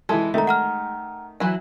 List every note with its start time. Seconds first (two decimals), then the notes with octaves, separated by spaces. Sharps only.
0.09 E3 G#3 E4 A4
0.34 D#3 A3 D#4 E5 A#5
0.47 F#5 A#5 F6
1.40 E3 F#3 E4